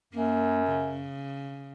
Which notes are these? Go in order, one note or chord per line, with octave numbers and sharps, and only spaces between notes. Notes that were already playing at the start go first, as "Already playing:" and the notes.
F#2 A#3
C#3